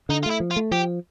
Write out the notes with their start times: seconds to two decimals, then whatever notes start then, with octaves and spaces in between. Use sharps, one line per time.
0.09 D3 D#4
0.23 F4
0.26 A3 E4
0.40 F3
0.51 F4
0.56 A3
0.71 F3 G4